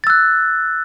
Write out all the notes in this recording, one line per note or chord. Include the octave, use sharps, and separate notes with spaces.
E6 F#6 A6